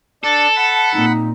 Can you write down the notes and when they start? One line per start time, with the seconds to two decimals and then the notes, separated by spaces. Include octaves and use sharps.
0.24 D4 A4 D5 A5
0.56 F#5 B5
0.94 A#2 C4 D#4